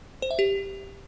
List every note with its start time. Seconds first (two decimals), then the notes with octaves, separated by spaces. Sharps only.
0.22 C5
0.31 E5
0.39 G4